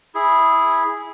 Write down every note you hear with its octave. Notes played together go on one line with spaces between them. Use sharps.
E4 G#4